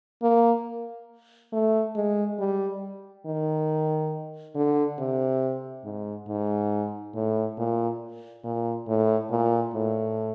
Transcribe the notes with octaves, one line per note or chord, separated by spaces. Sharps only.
A#3
A3
G#3
G3
D#3
D3
C3
G#2
G#2
A2
A#2
A#2
A2
A#2
A2